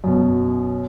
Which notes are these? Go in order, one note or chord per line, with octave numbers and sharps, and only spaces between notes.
F#2 B2